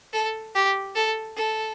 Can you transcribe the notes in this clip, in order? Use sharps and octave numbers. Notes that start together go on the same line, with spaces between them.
A4
G4
A4
A4